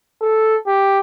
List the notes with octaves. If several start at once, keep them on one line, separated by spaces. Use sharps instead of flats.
A4
G4